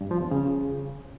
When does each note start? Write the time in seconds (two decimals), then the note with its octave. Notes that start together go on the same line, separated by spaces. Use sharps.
0.01 G2
0.11 F3
0.21 E2
0.31 C#3